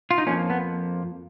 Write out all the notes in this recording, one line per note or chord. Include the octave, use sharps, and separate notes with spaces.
F4
D#4
F2 F3 A#3 C#4
B3